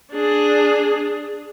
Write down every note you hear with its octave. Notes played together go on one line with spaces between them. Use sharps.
D4 G#4